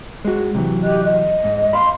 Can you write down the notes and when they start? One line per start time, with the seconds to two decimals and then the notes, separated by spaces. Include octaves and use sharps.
0.25 G#3 F#4
0.54 C3 E3 F#3
0.83 G4 D#5 F#6
1.05 D#5
1.44 G#2
1.73 F5 B5 C6